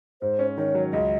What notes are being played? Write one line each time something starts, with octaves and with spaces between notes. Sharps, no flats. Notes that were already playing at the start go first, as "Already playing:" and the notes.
G#2 C5
C#4
D#3 C#5
F#3
C#2 D#5